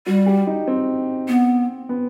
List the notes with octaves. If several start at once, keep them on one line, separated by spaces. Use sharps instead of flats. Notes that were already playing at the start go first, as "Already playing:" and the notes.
G3 F#4
G4
D#4
C4
B3
B3